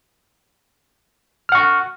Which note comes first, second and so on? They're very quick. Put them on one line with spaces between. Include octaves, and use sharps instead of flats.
F6 F#5 C#6